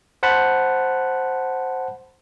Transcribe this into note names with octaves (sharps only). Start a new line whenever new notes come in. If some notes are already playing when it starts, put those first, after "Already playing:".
C5 F#5 A5 B5